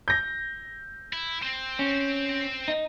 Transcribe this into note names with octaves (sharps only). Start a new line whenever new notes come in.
G6 A#6
E4
C4 C5
C#4
D#4